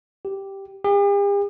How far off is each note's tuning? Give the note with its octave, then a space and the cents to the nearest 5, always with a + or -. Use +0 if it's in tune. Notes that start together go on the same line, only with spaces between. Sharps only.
G4 -5
G4 +45